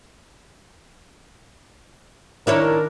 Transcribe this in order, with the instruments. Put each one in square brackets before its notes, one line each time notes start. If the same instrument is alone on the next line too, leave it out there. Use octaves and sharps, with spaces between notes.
[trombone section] D#3 A#4 [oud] D4 E4 C#5